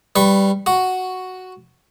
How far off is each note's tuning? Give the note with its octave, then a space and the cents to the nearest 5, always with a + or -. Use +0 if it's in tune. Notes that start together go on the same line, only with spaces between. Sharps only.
G3 +0 B4 +10 C#6 -25
F#4 +0 C#6 +0